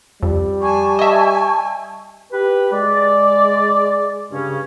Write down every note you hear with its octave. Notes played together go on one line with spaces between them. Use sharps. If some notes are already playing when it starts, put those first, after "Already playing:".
F2 G3
G#5 A5 C#6
D#5 E5
G4 B4
G#3 D5
G2 C#3 C#4